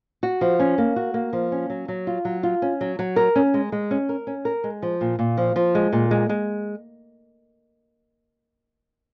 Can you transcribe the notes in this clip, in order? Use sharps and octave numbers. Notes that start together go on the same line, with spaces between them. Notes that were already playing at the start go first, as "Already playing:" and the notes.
F#4
F3
C#4
A#3
F#4
A#3
F3
C#4
F#3
F#3
F4
F#3
F4
C#4
F#3
F#3
A#4
C#4
G#3
G#3
C#4
A#4
C#4
A#4
G#3
F3
A#2
A#2
F3
F3
G#3
A#2
G#3
G#3